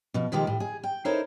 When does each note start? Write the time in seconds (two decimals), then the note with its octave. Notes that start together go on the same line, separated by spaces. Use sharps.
0.14 B2 F3
0.32 B2 D#3 F3 G#3 G4
0.47 A2
0.60 G#4
0.84 G5
1.05 D#4 E4 A4 A#4 C5 C#5